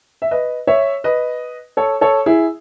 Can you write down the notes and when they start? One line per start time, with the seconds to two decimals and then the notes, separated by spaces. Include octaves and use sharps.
0.22 E5
0.31 B4 D#5
0.67 C#5 E5
1.04 B4 D#5
1.77 A4 C#5
2.01 A4 C#5
2.26 E4 G#4